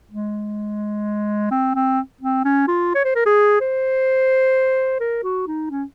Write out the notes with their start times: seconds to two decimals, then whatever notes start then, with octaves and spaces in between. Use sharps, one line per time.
0.11 G#3
1.51 C4
1.75 C4
2.21 C4
2.45 C#4
2.68 F4
2.95 C#5
3.05 C5
3.15 A#4
3.26 G#4
3.61 C5
5.00 A#4
5.24 F#4
5.47 D#4
5.70 C#4